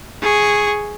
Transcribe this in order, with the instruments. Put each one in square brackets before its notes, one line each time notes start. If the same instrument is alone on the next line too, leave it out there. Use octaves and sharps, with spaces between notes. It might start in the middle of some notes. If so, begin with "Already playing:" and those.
[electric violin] G#4 C#6